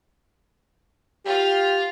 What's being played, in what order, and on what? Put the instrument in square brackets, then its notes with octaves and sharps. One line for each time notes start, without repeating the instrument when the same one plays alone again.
[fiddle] F4 F5 [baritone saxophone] G4